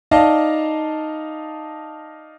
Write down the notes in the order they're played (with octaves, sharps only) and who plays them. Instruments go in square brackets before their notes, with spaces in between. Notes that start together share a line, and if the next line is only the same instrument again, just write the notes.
[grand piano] D#4 D5 D#5 F5 A5